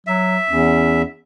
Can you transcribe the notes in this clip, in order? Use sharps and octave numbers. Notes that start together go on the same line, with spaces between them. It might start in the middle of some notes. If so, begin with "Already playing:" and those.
F#3 E5
E2 C#4